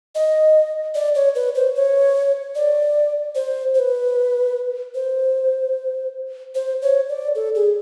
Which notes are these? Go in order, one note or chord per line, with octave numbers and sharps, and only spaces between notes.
D#5
D5
C#5
B4
C5
C#5
D5
C5
C5
B4
C5
C5
C#5
D5
A4
G#4